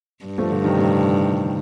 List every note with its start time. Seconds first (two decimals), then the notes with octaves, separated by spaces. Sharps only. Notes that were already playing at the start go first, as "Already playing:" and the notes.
0.25 G2
0.38 F3 A3
0.51 D3 F3
0.64 C3 D#3
0.78 A2 C3